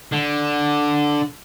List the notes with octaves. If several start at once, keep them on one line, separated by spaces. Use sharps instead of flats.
D3